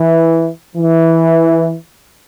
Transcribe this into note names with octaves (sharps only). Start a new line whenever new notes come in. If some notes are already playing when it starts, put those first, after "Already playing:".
Already playing: E3
E3